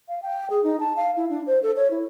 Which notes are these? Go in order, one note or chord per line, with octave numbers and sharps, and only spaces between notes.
F5
G5
G#4
D#4
A5
F5
E4
D4
C5
A4
C#5
E4